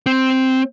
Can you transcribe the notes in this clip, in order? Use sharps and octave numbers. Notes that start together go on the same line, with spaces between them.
C4